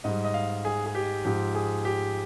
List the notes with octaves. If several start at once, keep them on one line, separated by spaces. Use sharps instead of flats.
G#2 G3 D#5
D#5
F5
G#4
G#4
G4
G#2 F3 G4
G#4
G4